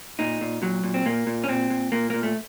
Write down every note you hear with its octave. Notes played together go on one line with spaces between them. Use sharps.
A#2 D#4
A#2
A#2 F#3
A#2
C4
A#2 A#3
A#2
C#4
A#2 C4
A#2
A#2 A#3
A#2 A#3
A3